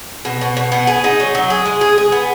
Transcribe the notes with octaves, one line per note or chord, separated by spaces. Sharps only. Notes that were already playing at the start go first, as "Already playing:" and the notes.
B2
B2
B2
B3
G#4
D#4
F#3
F#3
G#4
G#3
G#4
G#4
B3